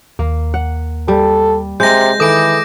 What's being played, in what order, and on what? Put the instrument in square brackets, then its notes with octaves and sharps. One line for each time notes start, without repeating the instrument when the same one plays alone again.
[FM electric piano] D#2 [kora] A#3
[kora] F#5
[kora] G3 [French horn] A4
[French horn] C3 [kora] G#3 [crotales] G6 A#6
[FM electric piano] D#3 A4 D#6 [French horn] E3 [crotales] D6 D7